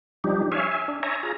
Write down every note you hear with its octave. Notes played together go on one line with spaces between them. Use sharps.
F3 G3 D4 D#4 G4
C#5 E5 F5 G#5
E5 G#5
D4
C#5 E5 G#5 A#5
F4 G#4 A#5